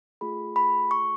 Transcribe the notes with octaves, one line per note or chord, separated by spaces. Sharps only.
A3 F4 G#4 B5
B5
C#6